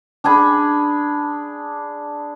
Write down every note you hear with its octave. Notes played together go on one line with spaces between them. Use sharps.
D4 G#4 G#5 B5